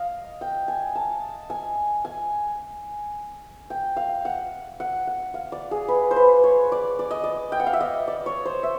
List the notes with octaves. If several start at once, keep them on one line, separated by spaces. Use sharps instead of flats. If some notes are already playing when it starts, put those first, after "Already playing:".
Already playing: D#5 F5
G5
G#5
A5
G#5
G#5
G5
F5
F#5
F#5
F#5
F5
D5
G#4
B4
C5
B4
C#5
D5
D5
D#5
D5
G5
F#5
F5
E5
D#5
D5
C#5
C5
E5